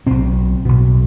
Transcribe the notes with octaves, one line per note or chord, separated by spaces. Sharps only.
B1 B2 C4
B1 B2